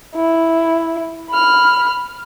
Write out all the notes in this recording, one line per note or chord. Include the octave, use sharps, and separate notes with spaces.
E4
B5 F6